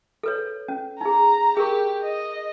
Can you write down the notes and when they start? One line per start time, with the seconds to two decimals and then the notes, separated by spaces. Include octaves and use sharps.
0.23 A4 B4 C#5
0.68 C#4
1.01 D#4 G#4 A#5
1.57 G4 G#4 A#4 C#6
2.03 D#5